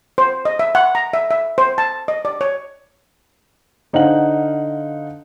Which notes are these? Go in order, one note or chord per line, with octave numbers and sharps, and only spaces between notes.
C5
D#5
E5
F#5
A#5
E5
E5
C5
A5
D#5
D5
C#5
D3 D#4 C5 F5 F#5 F#7